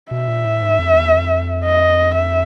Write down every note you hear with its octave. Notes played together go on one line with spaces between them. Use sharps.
B2 E5
A#2
A2
G#2
F2
E2
F2
D#5
E5